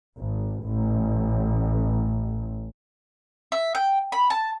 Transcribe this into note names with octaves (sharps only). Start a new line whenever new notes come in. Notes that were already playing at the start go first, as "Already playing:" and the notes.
G#1
A1
E5
G5
B5
A5